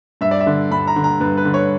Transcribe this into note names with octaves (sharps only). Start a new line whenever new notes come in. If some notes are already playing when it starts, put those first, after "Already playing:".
G2 E5
D5
E5
D3
G2 B5
A#5
D3
A#5
G2 B4
B4
D3
C#5